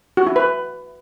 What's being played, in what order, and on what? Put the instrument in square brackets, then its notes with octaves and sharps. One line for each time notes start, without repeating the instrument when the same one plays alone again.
[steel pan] F#4
E4
B4